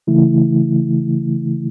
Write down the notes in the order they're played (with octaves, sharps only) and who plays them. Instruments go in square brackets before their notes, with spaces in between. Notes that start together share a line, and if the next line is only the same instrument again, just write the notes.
[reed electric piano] C#3 E3 A3 E4